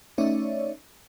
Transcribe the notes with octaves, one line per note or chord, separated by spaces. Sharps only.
A3 C#4 D#4 C#5 D5 E5